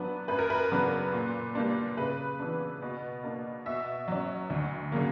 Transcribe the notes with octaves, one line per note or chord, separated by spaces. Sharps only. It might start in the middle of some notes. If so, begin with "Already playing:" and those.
Already playing: G2 F#3 B3 D4 B4
F#2 B4
A#4
B4
C#3 F#3 B3 D4
A#2
G3 A#3 D4
C#3 B4
E3 B3 D4
B2
A#3 D4
B2 E5
F#3 C#4
D2
C#3 F#3 A#3